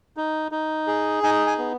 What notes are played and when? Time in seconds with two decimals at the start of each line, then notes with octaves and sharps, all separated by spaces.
0.17 D#4
0.52 D#4
0.87 G#4
1.23 D#4 G#5
1.47 G#5
1.58 B3